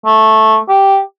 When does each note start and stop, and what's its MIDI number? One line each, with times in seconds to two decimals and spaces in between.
0.06 0.57 57
0.69 0.99 67